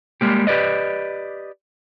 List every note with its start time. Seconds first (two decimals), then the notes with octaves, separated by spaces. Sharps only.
0.21 G3 G#3 A#3 G4
0.47 G4 B4 D5 D#5